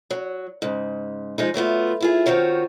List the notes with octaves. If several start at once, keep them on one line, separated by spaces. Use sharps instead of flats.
F#3
G#2 C#3
F3 G#3 D#4
F#3 A3 B3 F4
E4 F4 G#4
D#3 C4 F4 F#4 C#5